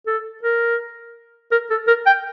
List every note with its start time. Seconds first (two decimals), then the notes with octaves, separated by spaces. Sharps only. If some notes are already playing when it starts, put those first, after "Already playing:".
0.07 A4
0.43 A#4
1.52 A#4
1.71 A4
1.87 A#4
2.06 G5